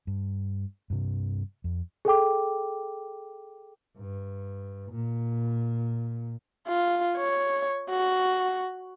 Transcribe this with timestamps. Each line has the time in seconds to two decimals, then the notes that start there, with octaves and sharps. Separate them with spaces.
0.07 G2
0.90 G2 C3
1.64 F2
2.05 G#4 A4 G5 D6
3.98 G2
4.91 A#2
6.68 F4
7.17 C#5
7.90 F#4